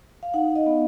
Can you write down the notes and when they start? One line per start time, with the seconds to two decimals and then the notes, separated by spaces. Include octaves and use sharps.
0.23 F5
0.34 D#4 F#5
0.56 D#5
0.66 B3